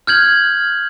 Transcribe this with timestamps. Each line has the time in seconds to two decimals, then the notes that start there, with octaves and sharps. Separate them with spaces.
0.07 F6 G6 G#6 F#7